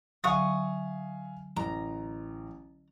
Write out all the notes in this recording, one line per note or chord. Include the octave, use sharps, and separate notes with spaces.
D3 F#3 E5 F5 G#5 C#6 D#6
A1 A#5